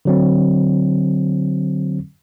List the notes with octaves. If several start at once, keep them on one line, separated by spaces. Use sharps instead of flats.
D3 F#3 C4